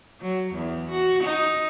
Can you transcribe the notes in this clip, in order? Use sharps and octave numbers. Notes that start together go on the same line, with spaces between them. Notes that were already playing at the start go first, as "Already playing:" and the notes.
F#3
E2
F#4
D#4